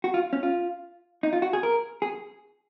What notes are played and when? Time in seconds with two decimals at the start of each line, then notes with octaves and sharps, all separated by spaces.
0.04 F#4
0.14 F4
0.33 C#4
0.43 F4
1.23 D#4
1.33 F4
1.42 F#4
1.53 G#4
1.63 A#4
2.02 G#4